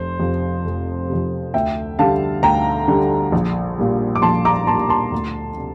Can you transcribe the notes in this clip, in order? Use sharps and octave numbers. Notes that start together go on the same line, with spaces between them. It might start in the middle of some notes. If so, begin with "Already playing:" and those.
Already playing: F1 C5
F2 C3
F1
F2 C3
D2 E5 G5
D3 G3 F5 A5
D2 G5 A#5
D3 G3
A#1
A#2 G3
D6
A#1 A5 C6
A#5 D6
A#2 G3 A5 C6
A5 C6
D2
C3